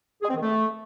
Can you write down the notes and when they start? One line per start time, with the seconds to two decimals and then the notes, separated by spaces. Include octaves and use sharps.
0.22 G#4
0.29 C4
0.35 D#3
0.41 A3